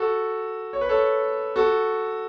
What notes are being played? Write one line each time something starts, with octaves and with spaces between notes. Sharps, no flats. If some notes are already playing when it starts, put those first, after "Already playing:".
Already playing: F#4 A4
C#5
B4
A4 C#5
F#4 A4